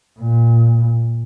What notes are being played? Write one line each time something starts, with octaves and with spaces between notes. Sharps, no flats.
A#2